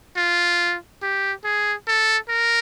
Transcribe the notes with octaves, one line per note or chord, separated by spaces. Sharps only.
F4
G4
G#4
A4
A#4